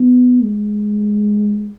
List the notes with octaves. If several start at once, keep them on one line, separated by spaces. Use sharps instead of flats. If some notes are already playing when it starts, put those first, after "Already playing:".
Already playing: B3
G#3